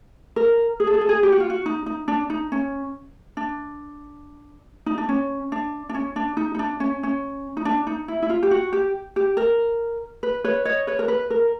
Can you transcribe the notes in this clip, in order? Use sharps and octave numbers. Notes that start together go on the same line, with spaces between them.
A#4
G#4
A4
G#4
A4
G#4
G4
F#4
F4
F#4
D#4
D#4
D4
D#4
C#4
D4
D#4
D4
C#4
D4
D4
C#4
D4
D#4
D#4
D4
C#4
C#4
D#4
D4
D#4
E4
E4
F4
G4
F#4
G4
G4
A#4
B4
B4 C#5
C#5 D#5
B4 C#5
A#4
B4
A#4